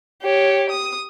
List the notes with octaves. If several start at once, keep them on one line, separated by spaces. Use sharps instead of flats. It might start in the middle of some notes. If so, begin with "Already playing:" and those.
G4 C#5
D#6